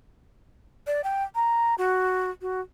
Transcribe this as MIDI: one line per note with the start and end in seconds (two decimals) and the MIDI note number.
0.87 1.01 74
1.04 1.23 79
1.35 1.75 82
1.78 2.31 66
2.41 2.61 66